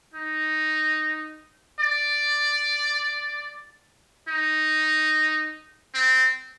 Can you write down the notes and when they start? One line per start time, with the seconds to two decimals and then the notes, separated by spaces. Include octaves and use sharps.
0.14 D#4
1.80 D5
4.29 D#4
5.94 C4